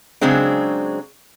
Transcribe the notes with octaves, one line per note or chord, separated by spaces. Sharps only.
C#3 F#3 G#3 C4 D4